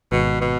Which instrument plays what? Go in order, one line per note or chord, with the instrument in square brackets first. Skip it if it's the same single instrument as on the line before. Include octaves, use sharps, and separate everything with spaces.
[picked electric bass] G#1 [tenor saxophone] B2
[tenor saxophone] B2